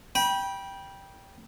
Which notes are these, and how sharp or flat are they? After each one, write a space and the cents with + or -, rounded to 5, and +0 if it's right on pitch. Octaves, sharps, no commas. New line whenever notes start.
G5 +0 B5 -30